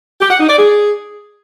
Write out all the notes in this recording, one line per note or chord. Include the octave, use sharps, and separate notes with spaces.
G4
F#5
D#4
D5
G#4